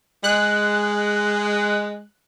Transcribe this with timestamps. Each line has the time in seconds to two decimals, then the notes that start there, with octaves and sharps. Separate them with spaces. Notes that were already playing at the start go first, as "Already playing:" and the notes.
0.24 G#3 F#6